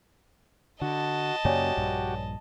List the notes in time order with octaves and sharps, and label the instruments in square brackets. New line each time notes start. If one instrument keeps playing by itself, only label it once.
[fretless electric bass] D3 [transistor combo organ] F#4 [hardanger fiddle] D#5 A5
[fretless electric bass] F#2 C#3 A#3 [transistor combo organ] F#4 G4 [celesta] C#5 D5 G#5
[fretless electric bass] A#1 G2